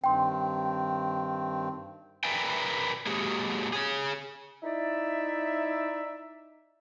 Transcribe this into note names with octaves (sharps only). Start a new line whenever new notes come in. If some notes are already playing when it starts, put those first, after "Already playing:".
G2 D#3 C4 G5 C6
A#4 B4 D5 E5 G5 G#5
F#3 G#3 A#3 G4 G#4 C#5
G#4 C#5
D#4 E4 D5 E5